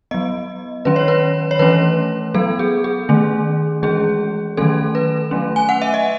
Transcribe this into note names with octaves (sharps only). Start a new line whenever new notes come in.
F#3 B3 D#5
D#3 F#3 C#4 B4
C#5
B4
C#5
E3 A3 C#4 B4
F#3 B3 A4
G#4
G#4
D#3 A3 C#4
E3 G#3 C#4 G#4
D#3 F#3 A3 C#4 A4
B4
F#3 A3 C#4
G#5
F#5
E5
D#5